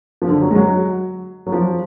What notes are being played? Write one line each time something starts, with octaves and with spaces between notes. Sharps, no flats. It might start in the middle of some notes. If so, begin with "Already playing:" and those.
F3
D3
F#3
G#3
F#3
F#3
F3